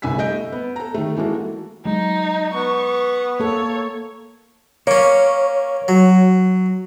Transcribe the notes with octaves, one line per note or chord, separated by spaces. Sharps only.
G1 C2 G2 G#5 E6 B6
A3 D#5 G6 D7
B3
A4 A#5
D#3 A3
E3 G#3 A#3 F#4 A4
F#3 G#3 D#4
B3 C#6
A#3 A4 C#5
A#3 C#4 C#5
F#3